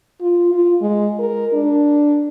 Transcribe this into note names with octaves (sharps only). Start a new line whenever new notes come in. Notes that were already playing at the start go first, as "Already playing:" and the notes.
F4
F4
G#3
A#4
D4